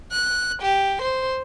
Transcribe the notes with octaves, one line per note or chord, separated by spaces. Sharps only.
F#6
G4
C5